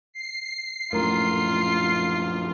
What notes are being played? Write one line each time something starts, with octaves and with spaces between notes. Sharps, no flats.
C7
A#1 F#2 A2 F4 A#4 A#5